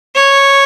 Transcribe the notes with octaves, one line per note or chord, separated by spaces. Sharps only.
C#5